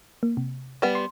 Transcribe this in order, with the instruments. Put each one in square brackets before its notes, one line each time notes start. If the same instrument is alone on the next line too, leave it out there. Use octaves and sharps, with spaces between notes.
[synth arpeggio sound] A#3
C3
[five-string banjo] G3 B3
[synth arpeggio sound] C6